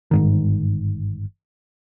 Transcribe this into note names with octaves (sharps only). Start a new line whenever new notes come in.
G1 G#2 D#3